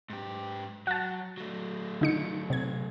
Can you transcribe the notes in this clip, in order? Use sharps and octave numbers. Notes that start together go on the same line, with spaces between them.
G#2 G4
F#3 F#5 A5
F#3 A3
D3 D#4 C#7
C3 G#6